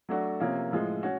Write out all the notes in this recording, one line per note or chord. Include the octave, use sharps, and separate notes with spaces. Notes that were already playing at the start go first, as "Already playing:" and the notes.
F#3 A3 D4 F#4
C3 F3 A#3 C#4
A2 F3 G#3
C#4 F#4